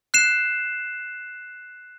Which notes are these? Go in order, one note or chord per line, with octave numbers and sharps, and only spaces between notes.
F#6 C7 E7